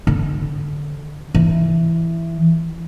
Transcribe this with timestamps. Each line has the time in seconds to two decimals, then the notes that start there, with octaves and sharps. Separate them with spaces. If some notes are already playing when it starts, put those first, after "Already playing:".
0.07 D3
1.35 E3